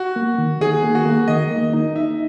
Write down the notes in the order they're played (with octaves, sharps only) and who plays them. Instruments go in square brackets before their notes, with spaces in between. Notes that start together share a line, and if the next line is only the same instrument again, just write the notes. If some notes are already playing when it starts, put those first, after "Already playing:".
Already playing: [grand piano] F#4
[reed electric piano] A#3
D#3
[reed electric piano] D#3 [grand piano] G#4
[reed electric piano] A#3
[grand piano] F#4
[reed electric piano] A#3
[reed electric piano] D#3 [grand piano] D#5
[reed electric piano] A#3
D#4
[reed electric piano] D#4 [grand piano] E5